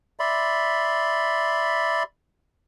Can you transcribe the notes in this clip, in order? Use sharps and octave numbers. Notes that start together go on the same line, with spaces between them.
D5 E5 B5 C6